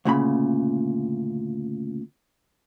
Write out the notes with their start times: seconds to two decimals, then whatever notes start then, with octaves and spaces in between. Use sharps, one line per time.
0.05 D2 A#2 C#3 B5